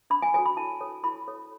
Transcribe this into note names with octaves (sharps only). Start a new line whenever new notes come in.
D4 B5
G#5
F#4 A4 C#5 G#5
B5
E4 A5
A4 C#5
E4 B5
A4 C#5